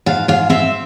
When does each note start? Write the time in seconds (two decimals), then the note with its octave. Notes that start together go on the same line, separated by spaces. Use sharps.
0.06 G#2 F5
0.28 G#2 F5
0.50 C4 E5